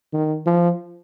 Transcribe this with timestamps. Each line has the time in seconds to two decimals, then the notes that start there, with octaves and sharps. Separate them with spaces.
0.13 D#3
0.46 F3